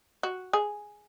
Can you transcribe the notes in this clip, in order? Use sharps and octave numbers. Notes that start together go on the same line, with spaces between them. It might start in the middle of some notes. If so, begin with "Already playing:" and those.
F#4
G#4